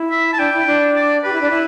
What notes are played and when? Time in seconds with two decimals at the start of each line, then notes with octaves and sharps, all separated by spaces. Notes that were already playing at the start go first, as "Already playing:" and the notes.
Already playing: E4
0.11 E5
0.33 A5
0.38 D4 G5
0.53 E4
0.67 D4
0.96 D5
1.24 G4 B4
1.33 E4
1.41 D4
1.50 E4